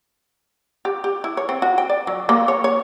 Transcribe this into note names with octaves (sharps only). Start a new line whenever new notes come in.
G4
G4
E4
C#5
C4
F#4
G5
D5
F#3
A#3
C#5
C#5